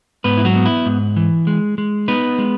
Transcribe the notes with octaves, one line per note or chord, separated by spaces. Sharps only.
G#2 B3 B4
E4
F#3 F#4
B3
E4
G#2
E3
G#3
G#3
B3 D#4 B4
G#3